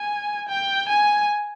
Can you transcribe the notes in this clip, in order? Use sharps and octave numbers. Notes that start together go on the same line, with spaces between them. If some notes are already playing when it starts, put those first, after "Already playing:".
Already playing: G#5
G5
G#5